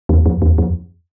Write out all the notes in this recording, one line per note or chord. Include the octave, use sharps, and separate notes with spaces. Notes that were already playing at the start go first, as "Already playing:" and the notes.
E2
F2
E2
F2